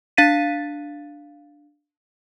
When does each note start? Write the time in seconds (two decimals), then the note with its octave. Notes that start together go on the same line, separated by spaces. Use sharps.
0.17 D4 F5 A6 B6 D#7